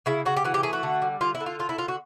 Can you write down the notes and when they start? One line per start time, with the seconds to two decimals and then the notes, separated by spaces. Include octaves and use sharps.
0.06 C#3 E4
0.25 C#3 F#4
0.37 G4
0.45 E3 F#4
0.54 G4
0.63 A3 G#4
0.73 F#4
0.83 D3
1.02 G3
1.21 D3 F4
1.35 E4
1.40 D3
1.46 F4
1.59 A3 F4
1.69 E4
1.78 D3 F4
1.88 F#4